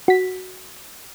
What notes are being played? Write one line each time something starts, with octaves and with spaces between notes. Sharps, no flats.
F#4 B6